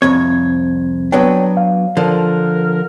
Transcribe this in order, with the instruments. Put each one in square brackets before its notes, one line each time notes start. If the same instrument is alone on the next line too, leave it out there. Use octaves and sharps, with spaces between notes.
[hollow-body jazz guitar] C2 F2 C#5 [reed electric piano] C4 G#6
[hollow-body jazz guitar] F#3 B3 D4 [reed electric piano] C#5 G5
[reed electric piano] F5
[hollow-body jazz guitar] D3 F3 [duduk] A#4